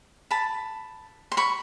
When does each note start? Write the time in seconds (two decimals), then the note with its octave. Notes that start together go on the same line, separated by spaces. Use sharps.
0.31 A5 B5
1.32 C6
1.37 B5 C#6